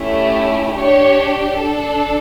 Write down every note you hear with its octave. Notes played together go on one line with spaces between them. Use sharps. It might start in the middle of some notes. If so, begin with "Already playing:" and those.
Already playing: A3 C#4 E4 G4
D4 G4 C#5
D4 A4